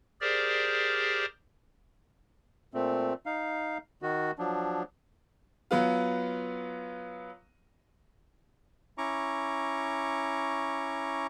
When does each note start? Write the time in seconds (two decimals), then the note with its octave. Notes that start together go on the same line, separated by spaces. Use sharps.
0.21 G4 G#4 A#4 C5 D5
2.74 A#2 A3 C4
3.26 D#4 F5
4.02 D#3 F#4
4.39 F3 F#3 D4
5.71 F#3 B3 F4
8.98 C#4 E4 A#5 C#6 D6